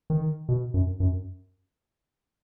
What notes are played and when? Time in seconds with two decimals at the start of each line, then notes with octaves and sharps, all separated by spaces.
0.10 D#3
0.49 B2
0.74 F#2
1.00 F#2